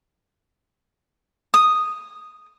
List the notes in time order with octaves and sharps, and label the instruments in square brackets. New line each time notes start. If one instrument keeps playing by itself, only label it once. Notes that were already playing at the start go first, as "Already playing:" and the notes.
[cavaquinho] D#6